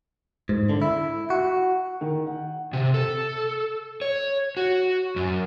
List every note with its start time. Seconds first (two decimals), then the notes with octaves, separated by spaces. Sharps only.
0.49 G#2
0.69 D3
0.82 E4
1.30 F#4
2.01 D#3
2.27 F#5
2.73 C3
2.94 A4
4.02 C#5
4.57 F#4
5.16 F#2